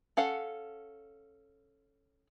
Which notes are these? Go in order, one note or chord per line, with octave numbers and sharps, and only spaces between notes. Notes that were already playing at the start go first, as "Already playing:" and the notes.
C#4 A4 F5 F#5